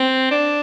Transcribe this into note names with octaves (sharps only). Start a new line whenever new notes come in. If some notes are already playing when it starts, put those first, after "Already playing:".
Already playing: C4
D4